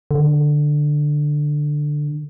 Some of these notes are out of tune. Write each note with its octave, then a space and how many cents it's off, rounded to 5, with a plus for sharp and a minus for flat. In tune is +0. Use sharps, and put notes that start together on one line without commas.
D3 +10